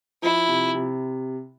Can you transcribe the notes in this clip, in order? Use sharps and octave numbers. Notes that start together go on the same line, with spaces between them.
F3 E4
C3
C3